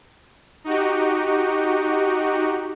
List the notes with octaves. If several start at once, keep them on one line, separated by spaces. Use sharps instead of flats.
D#4 F#4 G4